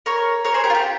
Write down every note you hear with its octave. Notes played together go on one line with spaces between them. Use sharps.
A#4 C#5
A#4 C#5
G#4 C5
G4 A#4
F4
G4